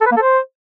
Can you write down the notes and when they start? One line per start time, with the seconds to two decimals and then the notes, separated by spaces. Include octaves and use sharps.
0.01 A4
0.06 B4
0.11 A#3
0.17 A4
0.22 C5